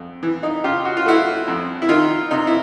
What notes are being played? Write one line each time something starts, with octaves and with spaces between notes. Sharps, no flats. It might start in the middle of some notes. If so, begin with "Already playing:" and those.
Already playing: F2
E3
D#4
C#3 F4 G4
F#4
F4
A3 E4 F#4
F2
E4
D#3 D#4 F4
C3 D#4
E4